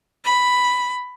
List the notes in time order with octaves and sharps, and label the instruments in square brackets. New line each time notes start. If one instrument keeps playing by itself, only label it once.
[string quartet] B5